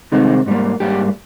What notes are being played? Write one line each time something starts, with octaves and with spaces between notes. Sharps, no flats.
C2 C3 D#3 G#3 C4 D#4
G#2 G3 A#3
G#2 G3 A#3 G4